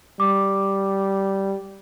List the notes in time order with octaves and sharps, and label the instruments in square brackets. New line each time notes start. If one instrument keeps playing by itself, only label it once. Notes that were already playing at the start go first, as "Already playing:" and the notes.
[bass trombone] G3 [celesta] D6